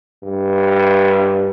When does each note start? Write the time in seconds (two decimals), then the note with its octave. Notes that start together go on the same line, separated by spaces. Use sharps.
0.23 G2